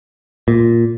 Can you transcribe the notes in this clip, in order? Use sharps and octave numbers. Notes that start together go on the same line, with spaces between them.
A#2